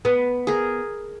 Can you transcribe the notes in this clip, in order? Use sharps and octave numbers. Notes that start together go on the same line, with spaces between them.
B3
G#4 A#4